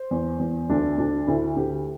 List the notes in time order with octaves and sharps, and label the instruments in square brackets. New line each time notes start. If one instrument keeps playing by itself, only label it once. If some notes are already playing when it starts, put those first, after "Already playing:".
Already playing: [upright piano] C5
E2
E2
D2 D4
D2 D4
D2 E4
D2 G4